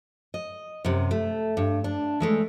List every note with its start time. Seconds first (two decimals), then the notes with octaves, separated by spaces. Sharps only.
0.34 D#5
0.85 F#2 C3
1.11 A3
1.57 G2
1.84 D4
2.20 E3 G#3 A3